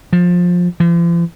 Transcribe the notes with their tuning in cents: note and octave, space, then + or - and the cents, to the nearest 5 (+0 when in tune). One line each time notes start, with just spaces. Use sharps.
F3 +20
F3 -45